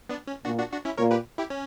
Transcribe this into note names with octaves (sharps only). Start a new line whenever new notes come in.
B3 D4
C#4
A#2 D4 F#4
D4 F#4
D4 F#4
C#4 E4
A#2 A#4 C#5
G4 B4
E4 G4
C#4